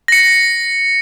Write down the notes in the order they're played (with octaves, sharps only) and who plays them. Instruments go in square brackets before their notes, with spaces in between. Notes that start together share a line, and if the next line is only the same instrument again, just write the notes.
[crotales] A#6 C#7